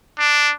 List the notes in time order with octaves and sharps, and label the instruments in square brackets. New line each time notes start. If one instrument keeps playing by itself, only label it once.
[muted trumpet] D4